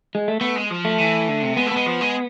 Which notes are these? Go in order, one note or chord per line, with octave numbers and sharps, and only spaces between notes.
G#3
A3
A3 B3
G#3
F3
A3
E3
D3
C3
G#3 B3
A3
B3
G#3
F3
G#3